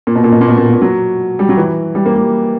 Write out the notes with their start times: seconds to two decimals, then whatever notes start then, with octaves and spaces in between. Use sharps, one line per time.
0.07 A#2
0.15 B2
0.24 A#2
0.32 B2
0.41 A#2
0.48 B2
0.58 A#2
0.66 B2
0.74 A#2
0.82 F#3
1.39 G3
1.49 F#3
1.57 E3
1.95 G3
2.06 A#3
2.16 G3